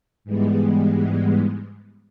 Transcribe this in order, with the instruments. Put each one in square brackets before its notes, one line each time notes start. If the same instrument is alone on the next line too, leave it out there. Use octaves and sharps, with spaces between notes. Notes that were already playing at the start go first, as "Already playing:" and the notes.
[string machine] G#2 E3 G3 G#3 B3